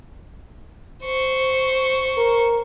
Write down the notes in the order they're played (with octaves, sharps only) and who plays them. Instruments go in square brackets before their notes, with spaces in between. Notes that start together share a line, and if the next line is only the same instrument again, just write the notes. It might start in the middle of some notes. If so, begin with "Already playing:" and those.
[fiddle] C5 C#6
[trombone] A#4